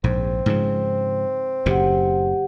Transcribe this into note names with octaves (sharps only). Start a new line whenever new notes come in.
A#1 G#2 C4
G#2 C#3 F3
F#1 F#2 A2 G4 F#5